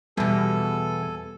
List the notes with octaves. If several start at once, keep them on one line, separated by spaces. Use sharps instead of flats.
E2 B2 G3 B3 A4 G#5